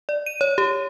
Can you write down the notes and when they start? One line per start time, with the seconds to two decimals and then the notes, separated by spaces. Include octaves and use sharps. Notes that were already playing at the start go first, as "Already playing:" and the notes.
0.09 D5
0.26 D#7
0.41 C#5
0.58 G4